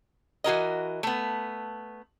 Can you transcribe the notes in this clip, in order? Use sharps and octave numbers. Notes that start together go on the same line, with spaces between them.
E3 F#4 A#4 D#5
A3 B3